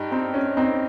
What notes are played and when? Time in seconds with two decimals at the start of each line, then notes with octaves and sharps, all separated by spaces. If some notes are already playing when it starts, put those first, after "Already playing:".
Already playing: G2 D#4 G4
0.11 C4 D#4
0.34 C#4
0.57 C4 D#4